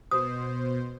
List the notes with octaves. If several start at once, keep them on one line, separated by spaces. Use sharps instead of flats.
B2 C5 D#6